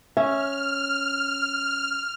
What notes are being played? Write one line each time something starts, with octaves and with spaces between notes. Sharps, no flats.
C#4 E5 F6